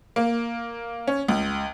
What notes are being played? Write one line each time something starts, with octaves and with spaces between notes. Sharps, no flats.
A#3
C#4
C#2